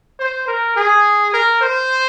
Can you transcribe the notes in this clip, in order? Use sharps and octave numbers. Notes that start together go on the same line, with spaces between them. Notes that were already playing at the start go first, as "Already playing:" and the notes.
C5
A#4
G#4
A#4
C5